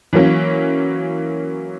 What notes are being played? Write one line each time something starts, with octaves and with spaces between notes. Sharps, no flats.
E3 F#3 A#3 C#4